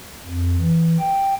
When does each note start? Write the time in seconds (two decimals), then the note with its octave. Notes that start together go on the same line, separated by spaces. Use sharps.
0.24 F2
0.57 E3
0.99 G5